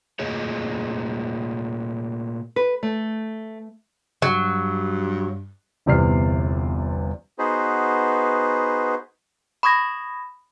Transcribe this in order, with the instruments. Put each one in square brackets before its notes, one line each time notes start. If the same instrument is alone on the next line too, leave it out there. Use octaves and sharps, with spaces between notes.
[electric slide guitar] A#2 A3 G#4 C#5 D#5
[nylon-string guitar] B4
A3
[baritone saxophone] G2 [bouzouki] F#3
[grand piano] G1 E2 C3 D5 F6 C7
[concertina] B3 D#4 F#4 G#4 B4 C5
[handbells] B5 C#6 D#6 G#6 A#6